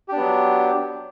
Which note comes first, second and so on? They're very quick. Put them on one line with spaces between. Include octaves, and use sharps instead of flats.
G4 D4 B3 F#3